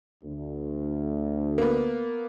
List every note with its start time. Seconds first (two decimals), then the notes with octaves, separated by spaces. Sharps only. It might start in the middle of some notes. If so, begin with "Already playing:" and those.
0.23 D2
1.58 A#3 B3